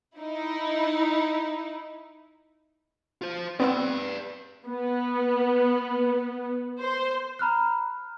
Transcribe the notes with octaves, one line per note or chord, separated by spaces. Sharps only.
D#4 E4
F4 C5
B3 C4 B4 D5 E6
B3
C5
A#5 B5 F6 F#6